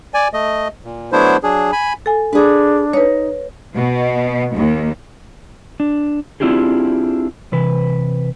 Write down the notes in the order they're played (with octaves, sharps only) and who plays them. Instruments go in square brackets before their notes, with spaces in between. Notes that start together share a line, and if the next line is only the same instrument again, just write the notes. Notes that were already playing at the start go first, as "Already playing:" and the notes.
[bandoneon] D5 G#5
A3 D#5
A#2
F#3 A3 B3 D4 E4 C5
F#3 D4 G#4
G#5 B5
[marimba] A4 G#5
[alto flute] D4 [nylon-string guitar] G#4 B4
[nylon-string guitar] D#4 [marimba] B4 C#5
[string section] B2
D#2
[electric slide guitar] D4
C4 D4 E4 F4 G4 G#4
C3 E3 B4